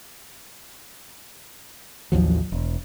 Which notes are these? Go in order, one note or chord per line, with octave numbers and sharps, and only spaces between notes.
A1 D#2 F3 F#3
E1